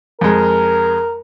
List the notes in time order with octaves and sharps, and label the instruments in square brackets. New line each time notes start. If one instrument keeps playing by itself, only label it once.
[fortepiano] F2 G#3 [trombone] A#4